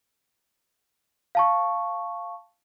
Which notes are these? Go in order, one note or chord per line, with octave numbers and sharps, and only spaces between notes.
F5 A5 C#6